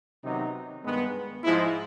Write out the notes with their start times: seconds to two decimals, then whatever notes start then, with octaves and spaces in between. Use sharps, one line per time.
0.23 C3 D#3 F#3 B3 D#4
0.83 G2 D#3 G#3 B3
1.44 G#2 F3 G#3 E4